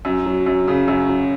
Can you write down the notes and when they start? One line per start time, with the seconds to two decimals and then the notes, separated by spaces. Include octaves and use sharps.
0.05 F#2
0.26 F#3
0.46 F#2
0.68 C#3
0.88 F#2
1.09 F#3